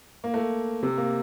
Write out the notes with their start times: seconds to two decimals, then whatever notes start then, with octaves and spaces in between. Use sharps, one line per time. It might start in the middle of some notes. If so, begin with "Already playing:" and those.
0.24 A#3
0.34 A3
0.83 C3
0.98 A#3